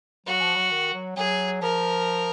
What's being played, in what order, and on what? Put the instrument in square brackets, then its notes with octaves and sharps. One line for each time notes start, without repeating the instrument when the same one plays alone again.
[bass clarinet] F#3 [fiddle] F#4
[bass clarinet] F3
F#3
D#3
F#3
[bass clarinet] F#3 [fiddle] G#4
[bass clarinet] F3 [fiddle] A#4